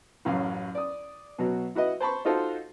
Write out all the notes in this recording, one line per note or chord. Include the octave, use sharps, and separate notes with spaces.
A1 F#2 F5
D5 D#6
B2 F#3 F#4
E4 F#4 B4 D#5
C5 A5 B5 C#6
D#4 F4 F#4 A4 C5